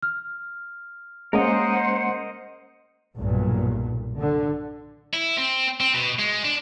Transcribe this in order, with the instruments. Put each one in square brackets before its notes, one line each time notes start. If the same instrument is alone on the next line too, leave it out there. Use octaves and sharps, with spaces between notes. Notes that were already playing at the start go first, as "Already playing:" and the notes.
[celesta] F6
[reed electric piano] G#3 A#3 C#4 [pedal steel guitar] A#4 D#5 [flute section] C5 F#5
[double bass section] B1 G2 A#2
D3
[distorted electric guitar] E4
C4
C4
B2
G#3
D4